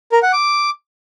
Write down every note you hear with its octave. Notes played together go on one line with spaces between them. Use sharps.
A#4
F#5
D6